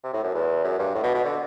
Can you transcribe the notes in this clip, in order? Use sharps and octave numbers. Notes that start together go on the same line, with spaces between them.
C3
A2
F#2
E2
F#2
G2
A2
B2
B2
D3